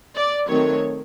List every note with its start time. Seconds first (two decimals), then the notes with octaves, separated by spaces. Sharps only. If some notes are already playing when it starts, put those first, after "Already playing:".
0.15 D5
0.48 D#3 F#3 A3 C4 C#5